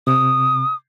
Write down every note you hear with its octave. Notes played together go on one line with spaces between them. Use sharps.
C3 D#6